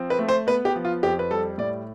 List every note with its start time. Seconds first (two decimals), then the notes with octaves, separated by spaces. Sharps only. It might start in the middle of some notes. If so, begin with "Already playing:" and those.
Already playing: F3 C4
0.10 B4
0.19 A3
0.29 C5
0.47 B3 B4
0.65 G4
0.76 F3
0.85 F4
1.03 F2 G4
1.19 B4
1.31 G3 A4
1.58 A2 D5